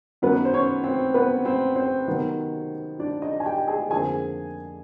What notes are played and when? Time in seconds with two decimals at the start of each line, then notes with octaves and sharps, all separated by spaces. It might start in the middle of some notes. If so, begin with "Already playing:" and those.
0.22 F#2 D#3 F#3 B3 B4
0.45 C5
0.53 C#4 C#5
0.84 C4 C5
1.14 B3 B4
1.45 C4 C5
1.76 C4 C5
2.08 C3 D#3 F#3 B3
2.99 D4 D5
3.22 D#4 D#5
3.40 G#5
3.45 G4 G5
3.68 G#4 G#5
3.91 F2 D3 F3 A#3 G#4 G#5